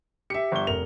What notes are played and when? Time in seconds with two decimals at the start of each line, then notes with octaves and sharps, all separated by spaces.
0.30 G4 E5 C#7
0.52 G1 G7
0.67 F1 A#4 F7